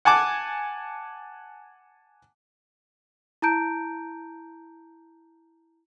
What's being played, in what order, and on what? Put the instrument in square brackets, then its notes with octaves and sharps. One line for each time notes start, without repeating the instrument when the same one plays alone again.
[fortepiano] F#5 G#5 A5 D6
[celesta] E4 A5 A#5 G6 D7